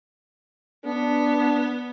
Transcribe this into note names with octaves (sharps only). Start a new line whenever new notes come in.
B3 D4